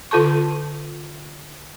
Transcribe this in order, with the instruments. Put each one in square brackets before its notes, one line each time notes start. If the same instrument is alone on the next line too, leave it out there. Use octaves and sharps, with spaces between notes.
[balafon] D3 F4 A4 A5 C#6